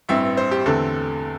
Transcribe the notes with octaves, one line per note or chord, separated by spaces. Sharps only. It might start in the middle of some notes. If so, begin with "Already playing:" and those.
A1 G2 E3 C4 E5
C5
G4
E2 D3 A3 C4 A4